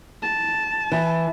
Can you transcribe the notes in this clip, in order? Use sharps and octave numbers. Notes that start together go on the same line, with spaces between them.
A5
E3